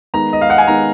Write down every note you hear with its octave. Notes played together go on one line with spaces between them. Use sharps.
D#3 G#3 B3 A#5
D#5
F5
F#5
G#5
D#3 G#3 B3 A#5